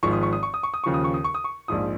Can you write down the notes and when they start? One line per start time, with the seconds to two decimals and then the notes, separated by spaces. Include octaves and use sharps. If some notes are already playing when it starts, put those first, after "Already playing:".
0.03 G#1 G#2 F3 C#6
0.13 D#6
0.23 C#6
0.33 D#6
0.43 C#6
0.54 D#6
0.63 C#6
0.74 D#6
0.84 D#2 C#3 F3 C#6
0.94 D#6
1.04 C#6
1.14 D#6
1.24 C#6
1.34 D#6
1.44 C#6
1.68 A#1 G#2 F3 D#6